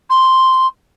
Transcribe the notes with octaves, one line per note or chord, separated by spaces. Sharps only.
C6